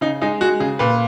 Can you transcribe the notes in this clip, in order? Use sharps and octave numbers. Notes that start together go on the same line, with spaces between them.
C#3 D#4
G#3 D#4
G#3 F#4
C#3 G#4
A#2 B4